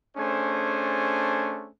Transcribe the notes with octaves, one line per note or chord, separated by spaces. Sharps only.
A3 C#4 D4 G#4 C5 G#5